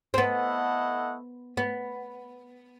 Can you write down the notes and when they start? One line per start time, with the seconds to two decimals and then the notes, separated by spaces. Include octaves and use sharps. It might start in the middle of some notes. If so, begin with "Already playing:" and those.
0.14 C4
0.18 A3 B3 E4 A4 D#5 F#5
1.57 B3